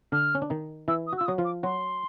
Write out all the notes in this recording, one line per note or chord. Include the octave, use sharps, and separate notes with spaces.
D3 D4 F6
C#4
D4
D#3 D#4
E3 E4 E6
D#6
F#4
F4 E6
F#3 F#4 D#6
F3 F4
D6
F#3 F#4 C6